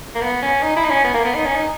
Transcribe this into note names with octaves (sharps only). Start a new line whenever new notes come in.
A#3
B3
C#4
D#4
E4
D#4
C#4
B3
A#3
B3
D#4
C#4
D#4